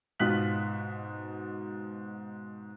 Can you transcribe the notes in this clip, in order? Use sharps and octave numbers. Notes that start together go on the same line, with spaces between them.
G#2 B2 F4 F#6 B6 F#7